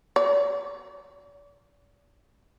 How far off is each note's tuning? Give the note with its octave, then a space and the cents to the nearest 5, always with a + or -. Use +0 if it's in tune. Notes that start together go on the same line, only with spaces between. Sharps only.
D5 -40